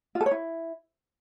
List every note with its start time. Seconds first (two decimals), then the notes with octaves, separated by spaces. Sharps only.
0.15 F4
0.21 A4
0.26 C#5
0.31 E4